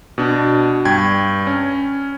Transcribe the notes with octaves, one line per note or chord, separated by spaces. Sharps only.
B2 D4
G2 G5 G#6
C#4